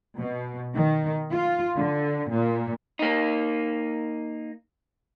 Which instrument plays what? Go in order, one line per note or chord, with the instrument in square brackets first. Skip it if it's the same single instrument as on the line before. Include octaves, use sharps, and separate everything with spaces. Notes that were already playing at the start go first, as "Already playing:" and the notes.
[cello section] B2
D#3
F4
D3
A#2
[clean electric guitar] A#3 D#4